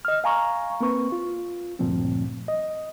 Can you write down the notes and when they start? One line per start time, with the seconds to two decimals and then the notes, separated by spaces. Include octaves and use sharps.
0.05 D#5 F6
0.24 F5 G#5 A#5 C#6
0.81 A#3 C4 B4 C#6
1.12 F4
1.79 D2 G2 A#2 F3 A3 C4
2.48 D#5